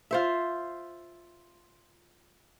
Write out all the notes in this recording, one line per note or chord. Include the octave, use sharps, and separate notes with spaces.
F4 C5 E5